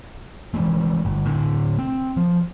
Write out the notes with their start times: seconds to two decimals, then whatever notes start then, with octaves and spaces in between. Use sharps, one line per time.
0.54 E3 F3 G#3 A3
1.05 G1
1.25 A2 D3
1.79 C4
2.17 F3